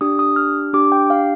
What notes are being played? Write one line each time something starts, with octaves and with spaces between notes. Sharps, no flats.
D4 G4 D#6
D#6
F6
D4 G4 D6
G5
F5